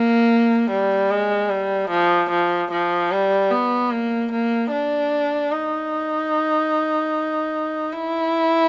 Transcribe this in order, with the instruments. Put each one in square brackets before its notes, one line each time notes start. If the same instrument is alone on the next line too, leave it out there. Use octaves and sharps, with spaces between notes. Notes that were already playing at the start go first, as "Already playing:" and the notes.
Already playing: [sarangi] A#3
G3
G#3
G3
F3
F3
F3
G3
B3
A#3
A#3
D4
D#4
E4